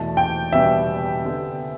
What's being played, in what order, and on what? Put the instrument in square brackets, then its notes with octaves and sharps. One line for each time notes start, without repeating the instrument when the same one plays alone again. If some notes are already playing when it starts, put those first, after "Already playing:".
Already playing: [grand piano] E2 B2 A3 E4 [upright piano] A5
[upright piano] G5
[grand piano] E2 B2 G3 B3 D4 [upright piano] E5
[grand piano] D3 B3 G4